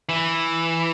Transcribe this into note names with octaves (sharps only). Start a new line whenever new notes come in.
E3